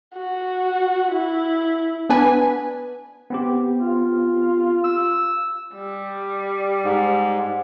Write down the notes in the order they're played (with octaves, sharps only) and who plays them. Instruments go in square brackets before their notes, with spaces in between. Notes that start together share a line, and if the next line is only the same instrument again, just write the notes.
[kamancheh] F#4
E4
[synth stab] B3 D4 B4 G#5
[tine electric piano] B3 C4 G4
[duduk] F4
[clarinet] E6
[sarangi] G3
[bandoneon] G#2